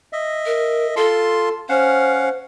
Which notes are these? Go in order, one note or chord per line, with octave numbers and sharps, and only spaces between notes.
D#5 E5
A#4
F4 A4 A5 C6
C#4 C5 F5 F#5